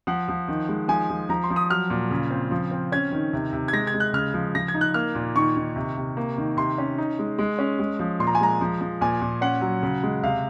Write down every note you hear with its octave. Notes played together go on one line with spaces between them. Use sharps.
F3 F#5
F3
D#3
G#3
F3 G#5
F3
F3 A#5
C6
F3
D#6
F#3 F6
A#2
C#3
C4
F3
C4
C#4 G#6
D#3
C3
C3
G#6
G#3 A#6
G#6
G#3
F#6
C#3 F6
F3
F3 A#6
G#6
D#4
F#6
A#3 F6
A#2
D#3 C#6
D#3
C3
C3
A#3
D#3
C3 C6
C#4
D#4
G#3
G#3
C#4
G#3
F3
A#2 C6
A#5
G#5
G#3 A#5
F3
F3
A#2 G#5
A#2
C#4 F#5
F#3
C#3
G#3
C3 F5